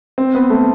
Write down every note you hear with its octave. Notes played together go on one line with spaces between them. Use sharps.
C4
B3
A3